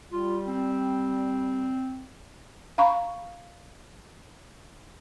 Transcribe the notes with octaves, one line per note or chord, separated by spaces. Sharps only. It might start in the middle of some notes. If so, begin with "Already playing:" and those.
G3 F4
C4
F5 A#5 B5 C#6